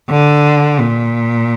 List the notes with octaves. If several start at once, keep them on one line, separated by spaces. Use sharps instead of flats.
D3
A#2